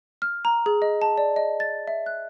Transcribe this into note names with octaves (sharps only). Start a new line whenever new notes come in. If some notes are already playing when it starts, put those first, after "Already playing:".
F6
A#5
G#4
D#5
A5
D5
D#5
A6
E5
F#6